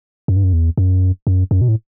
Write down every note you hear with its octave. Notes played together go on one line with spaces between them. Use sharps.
F#2
G2
F#2
E2
F#2
F#2
F#2
B2
A2